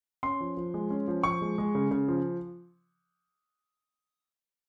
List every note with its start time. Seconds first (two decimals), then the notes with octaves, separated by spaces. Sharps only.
0.23 C#4 C6
0.40 F3
0.57 F3
0.74 G#3
0.90 C#4
1.08 F3
1.23 F3 C#6
1.41 G#3
1.58 G#3
1.75 C#3
1.91 C#3
2.08 F3